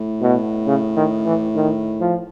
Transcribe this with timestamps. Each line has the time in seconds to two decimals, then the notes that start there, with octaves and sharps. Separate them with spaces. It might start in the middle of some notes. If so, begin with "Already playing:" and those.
Already playing: A2
0.21 B2
0.66 C#3
0.96 D#3
1.25 E3
1.55 D#3
2.00 F3